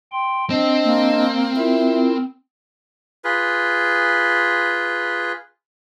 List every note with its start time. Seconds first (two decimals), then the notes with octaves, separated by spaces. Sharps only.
0.12 G5 C6
0.50 C4 D4 D#5
0.85 A#3
1.56 E4 F4 A#4 E5
3.24 F4 G#4 B4